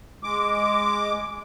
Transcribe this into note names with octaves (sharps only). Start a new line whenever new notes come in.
G#3 D6